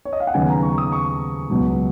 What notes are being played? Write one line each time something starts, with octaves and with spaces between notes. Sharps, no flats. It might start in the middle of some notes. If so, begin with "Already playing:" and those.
C#5
D#5
F5
F#5
D#2 C#3 F#3 B3 G#5
A#5
C#6
D#6
C#6
C#2 B2 F#3 B3